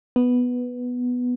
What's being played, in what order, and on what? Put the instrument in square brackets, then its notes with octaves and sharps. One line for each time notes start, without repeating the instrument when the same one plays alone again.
[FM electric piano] B3